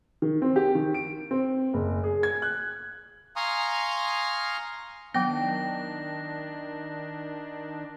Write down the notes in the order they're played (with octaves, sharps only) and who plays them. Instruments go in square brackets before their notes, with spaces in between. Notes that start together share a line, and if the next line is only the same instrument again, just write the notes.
[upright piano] D#3
C4
G4
D#3
D7
C4
F#1
G#4
G#6
F#6
[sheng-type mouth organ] F5 G#5 A#5 C6 C#6 D#6
[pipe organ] D#3 D4 [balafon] F#3 B3 [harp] G5 [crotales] A#6